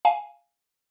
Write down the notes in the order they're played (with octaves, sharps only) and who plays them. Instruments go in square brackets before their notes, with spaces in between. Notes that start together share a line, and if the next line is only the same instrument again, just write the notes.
[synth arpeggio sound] F5 G#5